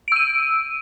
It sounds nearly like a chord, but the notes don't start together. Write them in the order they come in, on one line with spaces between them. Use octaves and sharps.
D7 E6 D#7